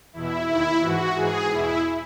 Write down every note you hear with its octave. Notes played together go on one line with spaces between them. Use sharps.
E2 B2 E4
D#2 D#3 E4
G#2 E3 F#4
G#2 E3 G#4
E2 B2 E4